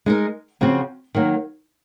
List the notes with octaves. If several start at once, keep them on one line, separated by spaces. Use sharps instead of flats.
G#3 D#4 A#4
C#3 F3 C4 F#4
D#3 F#3 A#3